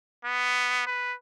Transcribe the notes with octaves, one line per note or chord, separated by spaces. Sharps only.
B3
B4